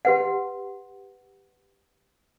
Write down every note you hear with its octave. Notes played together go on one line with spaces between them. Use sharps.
G4 B4 F#5